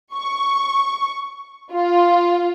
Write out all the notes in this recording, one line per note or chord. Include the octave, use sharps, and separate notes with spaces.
C#6
F4